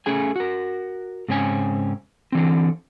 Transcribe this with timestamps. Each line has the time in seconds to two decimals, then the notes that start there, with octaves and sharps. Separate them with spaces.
0.06 A3 C#4 G#4 G#5
0.36 F#4 A#4
1.28 G#2 C#3 C4 C#4 G#5
2.32 D3 E3 C4